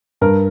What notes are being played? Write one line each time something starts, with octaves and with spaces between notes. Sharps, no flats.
G2 A#4